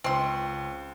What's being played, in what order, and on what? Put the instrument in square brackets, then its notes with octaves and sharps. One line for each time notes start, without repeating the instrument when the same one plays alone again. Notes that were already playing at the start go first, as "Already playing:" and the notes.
[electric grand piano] C#2 [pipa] C4 C6